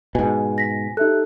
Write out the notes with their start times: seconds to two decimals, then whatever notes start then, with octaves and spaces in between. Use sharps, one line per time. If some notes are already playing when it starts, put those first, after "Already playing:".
0.15 G#2 B2 G#5
0.58 A#6 B6
0.97 D#4 G4 A4 E5 F#6